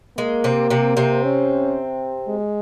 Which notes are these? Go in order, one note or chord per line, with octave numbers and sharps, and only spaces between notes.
G#3 A#3
C3 C4
C3 C4
C3 C4
C#4
G#3